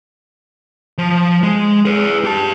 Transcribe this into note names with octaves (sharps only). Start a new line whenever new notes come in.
F3
G#3
G#4 B4
G4 A5